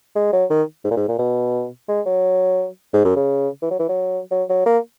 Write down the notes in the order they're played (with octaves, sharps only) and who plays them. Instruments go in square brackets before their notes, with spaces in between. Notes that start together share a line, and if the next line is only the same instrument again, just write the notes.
[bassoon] G#3
F#3
D#3
G#2
A#2
G#2
A#2
B2
G#3
F#3
G#2
F#2
C#3
E3
F#3
E3
F#3
F#3
F#3
A#3